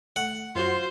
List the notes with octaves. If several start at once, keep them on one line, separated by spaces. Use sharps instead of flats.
A3 F#5
F#2 F#3 F4 F#4 C5